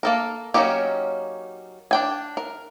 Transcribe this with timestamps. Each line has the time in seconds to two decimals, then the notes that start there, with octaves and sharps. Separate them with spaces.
0.03 A#3 A4 A#4
0.54 F#3 A#3 C#4 D#4 G4
1.91 D4 G5 G#5
2.37 A#4